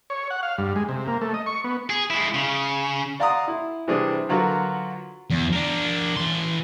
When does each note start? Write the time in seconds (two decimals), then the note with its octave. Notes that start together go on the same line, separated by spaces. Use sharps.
0.10 C#5
0.30 F#5
0.43 F5
0.58 G2
0.76 G#3
0.89 C3
1.07 A#3
1.21 A3
1.34 D#5
1.46 C#6
1.64 B3
1.90 G#4
2.10 G#3 E4
2.34 C#3
3.20 D5 F5 F#5 A#5 C6 D#6
3.48 E4
3.88 C3 E3 G3 C4 D4 G#4
4.29 D3 F#3 F4 F#4 A#4 B4
5.30 E2
5.53 D4 A#4
6.17 E3 C6